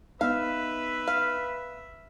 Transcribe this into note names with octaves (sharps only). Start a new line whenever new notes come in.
B3 D#4 B4 E5 F5
F5